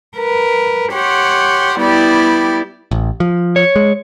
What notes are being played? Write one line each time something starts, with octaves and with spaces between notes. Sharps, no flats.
A#4 B4
G4 C#5 F#5 G5 C6
G3 B3 E4 G4 D5
A1
F3
C#5
G#3